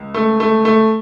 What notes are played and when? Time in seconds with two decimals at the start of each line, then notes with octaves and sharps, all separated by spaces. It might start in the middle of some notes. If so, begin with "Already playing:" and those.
Already playing: C#2
0.14 A3
0.40 A3
0.65 A3